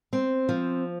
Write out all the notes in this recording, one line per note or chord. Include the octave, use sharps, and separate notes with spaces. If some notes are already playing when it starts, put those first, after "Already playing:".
C4
F3